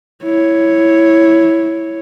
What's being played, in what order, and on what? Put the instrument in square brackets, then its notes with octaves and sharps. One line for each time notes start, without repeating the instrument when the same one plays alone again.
[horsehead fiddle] E4 C#5